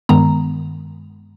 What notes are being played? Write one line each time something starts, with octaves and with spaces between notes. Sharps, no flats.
G2 D#3 G#3 B3 A#5